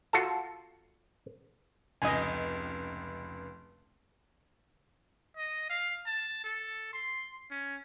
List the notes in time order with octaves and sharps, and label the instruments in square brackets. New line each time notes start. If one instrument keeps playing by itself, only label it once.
[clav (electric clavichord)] F4 F#4 A4 A5
[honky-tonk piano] F1 C#2 [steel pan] D#5 G#5
[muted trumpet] D#5
F5
A5
A4
C6
C#4